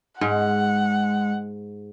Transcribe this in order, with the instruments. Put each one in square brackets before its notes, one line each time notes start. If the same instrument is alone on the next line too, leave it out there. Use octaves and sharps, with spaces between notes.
[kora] G#2 [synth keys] G#3 [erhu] F#5